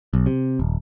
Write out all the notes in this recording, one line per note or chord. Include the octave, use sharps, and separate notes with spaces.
B1
C3
D#1